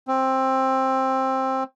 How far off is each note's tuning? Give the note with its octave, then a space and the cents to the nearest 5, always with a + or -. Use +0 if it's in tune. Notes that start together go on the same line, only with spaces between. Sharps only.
C4 +15